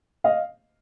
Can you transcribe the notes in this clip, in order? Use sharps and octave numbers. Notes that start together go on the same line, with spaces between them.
D#5 F5